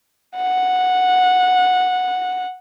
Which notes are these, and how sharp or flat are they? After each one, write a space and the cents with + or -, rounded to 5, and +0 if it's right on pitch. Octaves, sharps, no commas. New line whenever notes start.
F#5 -10